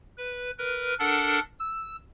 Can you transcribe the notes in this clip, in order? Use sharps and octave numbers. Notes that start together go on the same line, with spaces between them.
B4
A#4 B4
D4 A4 A#4 F#5
E6